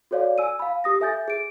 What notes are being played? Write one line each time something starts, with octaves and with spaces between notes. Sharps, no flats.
F#4 A4 C#5 D5 F5
G#5 E6 D#7
F5 B5
G4 D#6 A#6
A4 E5 G#5 G6 A6
G#4 D7